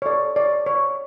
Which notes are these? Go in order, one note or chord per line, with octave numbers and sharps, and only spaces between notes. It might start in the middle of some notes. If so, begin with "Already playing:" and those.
C#5
A4 D5
C#5 D5
C#5